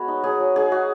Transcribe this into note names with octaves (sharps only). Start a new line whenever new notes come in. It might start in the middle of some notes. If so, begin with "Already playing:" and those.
Already playing: G#3 B3 F#4 C#5
D#4
F#3 G#4
F#3
D#4 G#4
D#4 F#4